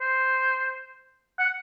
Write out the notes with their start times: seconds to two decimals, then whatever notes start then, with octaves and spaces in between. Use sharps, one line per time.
0.01 C5
1.39 F#5